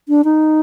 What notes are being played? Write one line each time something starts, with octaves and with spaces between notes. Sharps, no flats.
D4
D#4